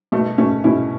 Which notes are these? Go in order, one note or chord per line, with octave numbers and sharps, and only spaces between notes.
B2 A3
B2 A3 C#4
B2 C#4 E4